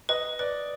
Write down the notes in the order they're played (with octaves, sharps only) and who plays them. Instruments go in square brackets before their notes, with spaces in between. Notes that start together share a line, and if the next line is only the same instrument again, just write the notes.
[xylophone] B4 [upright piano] D#5
[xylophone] B4 [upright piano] D5